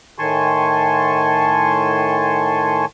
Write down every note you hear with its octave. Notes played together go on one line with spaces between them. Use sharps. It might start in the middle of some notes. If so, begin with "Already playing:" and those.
A2 D#3 G#5 A5 C6 C#6